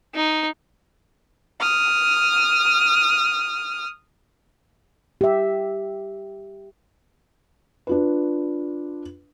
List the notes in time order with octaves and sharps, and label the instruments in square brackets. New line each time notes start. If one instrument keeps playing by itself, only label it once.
[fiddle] D#4
[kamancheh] D#6 F6
[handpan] G4 E5
[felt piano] D4 F4 B4